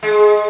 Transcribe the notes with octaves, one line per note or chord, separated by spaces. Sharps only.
G#3